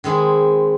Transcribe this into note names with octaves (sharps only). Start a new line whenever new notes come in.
D#3 G#3 C4 E4 G#4